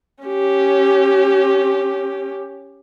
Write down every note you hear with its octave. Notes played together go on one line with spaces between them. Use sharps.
C#4 G4